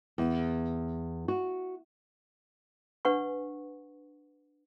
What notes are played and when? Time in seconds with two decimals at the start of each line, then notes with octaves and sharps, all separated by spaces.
0.18 E2
1.28 F#4
3.05 D4 B4 F#5 G#5 C#6